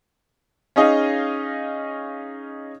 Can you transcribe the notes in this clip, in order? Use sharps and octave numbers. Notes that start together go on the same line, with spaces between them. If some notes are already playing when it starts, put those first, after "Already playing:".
C#4 D#4 G#4 D#5 F5